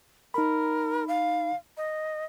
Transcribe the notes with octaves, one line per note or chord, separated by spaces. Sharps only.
D#4 A#4 B5
F5
D#5